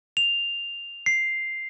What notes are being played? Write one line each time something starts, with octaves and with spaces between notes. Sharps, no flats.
F7
C7